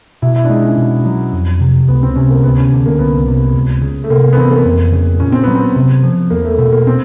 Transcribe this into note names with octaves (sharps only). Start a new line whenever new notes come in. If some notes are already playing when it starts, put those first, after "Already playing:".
B2 E4
E4
D4
G#3 D#4
C#4
B2
F#3
F2
C3
C#2 B3
C4
C3 C#4
A#3
D2 B3
C#4
D3
A#3
C2 B3
C3
C#2
C#3
A3
C3 A#3
A#3
B3
E3 C4
A#3
F2
C#3
A#2 C#4
C4
F#3 B3
C4
C3
F3
E2 A#3
A3
B2 A3
A#3
C4